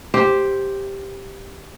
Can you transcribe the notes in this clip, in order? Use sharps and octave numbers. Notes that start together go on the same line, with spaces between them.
G4 C5